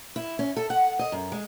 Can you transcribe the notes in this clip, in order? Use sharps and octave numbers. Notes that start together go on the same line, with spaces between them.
E4
C#4
A4
F#5
D#5
F#2
G#3